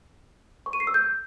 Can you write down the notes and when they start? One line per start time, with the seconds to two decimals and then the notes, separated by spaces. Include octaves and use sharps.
0.66 C#6
0.73 D#7
0.80 C7
0.87 E6
0.94 G6